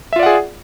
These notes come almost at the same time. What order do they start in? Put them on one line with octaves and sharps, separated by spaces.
E5 F4 D5 F#5 G#4